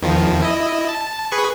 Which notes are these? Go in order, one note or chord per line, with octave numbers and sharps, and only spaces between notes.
E2 D#3 F3
E4 D#5
A5
G#4 B4 C#6